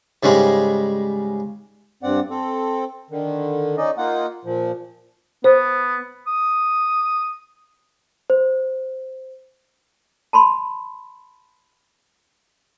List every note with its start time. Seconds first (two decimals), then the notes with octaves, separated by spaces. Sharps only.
0.23 G#2 C#3 G3 G#3
2.03 G2 C4 D5 F#5
2.30 C4 A4
3.11 D3 D#3
3.77 C#4 D#4 D5 D#5
3.98 A#3 D#4 F4 F#5
4.45 A#2 F3
5.44 B3 C5
6.27 D#6
8.30 C5
10.33 A5 B5 C6